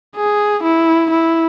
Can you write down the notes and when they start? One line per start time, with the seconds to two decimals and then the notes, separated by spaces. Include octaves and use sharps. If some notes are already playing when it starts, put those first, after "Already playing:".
0.17 G#4
0.64 E4
1.11 E4